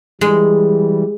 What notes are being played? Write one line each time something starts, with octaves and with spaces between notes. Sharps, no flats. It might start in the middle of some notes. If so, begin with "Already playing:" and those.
E3 G3 G#3